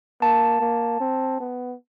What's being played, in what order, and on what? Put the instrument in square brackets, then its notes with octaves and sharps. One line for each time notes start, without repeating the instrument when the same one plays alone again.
[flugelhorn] A#3 [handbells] A5
[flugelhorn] A#3
C4
B3